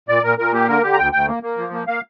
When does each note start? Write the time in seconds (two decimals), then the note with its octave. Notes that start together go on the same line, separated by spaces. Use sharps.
0.09 A#2 D5
0.23 A#2 A#4
0.38 A#2 A#4
0.53 A#3 G4
0.68 D3 A#4
0.83 D3 G4
0.93 A#5
0.98 D2 G5
1.12 D2 G5
1.28 A#3
1.43 A#3
1.57 F3
1.73 A#3
1.87 A#3 F5